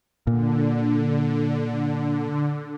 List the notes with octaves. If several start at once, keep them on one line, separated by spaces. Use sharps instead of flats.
A#2 D3